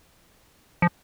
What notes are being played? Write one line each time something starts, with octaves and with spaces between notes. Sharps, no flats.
F3